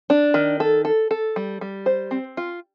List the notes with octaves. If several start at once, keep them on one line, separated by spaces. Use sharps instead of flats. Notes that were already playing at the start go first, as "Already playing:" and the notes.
D4
D#3
A4
A4
A4
G3
G3
C5
C4
F4